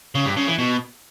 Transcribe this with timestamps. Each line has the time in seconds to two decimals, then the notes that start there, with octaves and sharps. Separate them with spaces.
0.15 C#3
0.26 G2
0.37 C#3
0.48 E3
0.59 B2